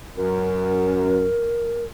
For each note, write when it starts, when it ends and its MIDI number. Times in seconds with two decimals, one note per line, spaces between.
0.17 1.29 42
0.17 1.85 70